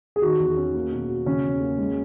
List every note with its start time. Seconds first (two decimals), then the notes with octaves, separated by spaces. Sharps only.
0.16 G#4
0.22 D#3 F#4
0.40 E2
0.57 C#4
0.74 A#3
0.92 B2
1.09 F#4
1.26 C#3 C#4
1.43 E2
1.61 A#3
1.78 G#3